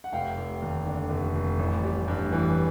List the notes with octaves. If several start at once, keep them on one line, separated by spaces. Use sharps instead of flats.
F#5
F1 F5 G5
F1
D#2
D3
F1
F1
A1
G3
G2
E3